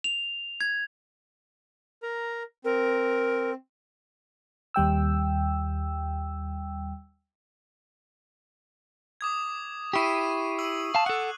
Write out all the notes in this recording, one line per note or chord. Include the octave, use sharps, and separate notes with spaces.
F7
G#6
A#4 A#5
C4 A#4
D#2 G3 G5 E6
D6 D#6 G#6
E4 G4 C#6 C7 D#7
E6 F#7
F5 A5
A4 F#5 F#6